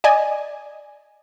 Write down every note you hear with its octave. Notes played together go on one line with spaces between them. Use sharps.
D5 D#5 G#5